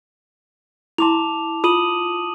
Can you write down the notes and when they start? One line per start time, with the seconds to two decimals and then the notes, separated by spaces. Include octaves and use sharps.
0.98 E4 A5 C6 D6 F7
1.64 F4 D#6 D#7 F#7